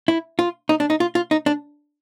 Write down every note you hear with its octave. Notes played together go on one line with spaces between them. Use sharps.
E4
F4
D#4
D4
D#4
F4
F4
D#4
D4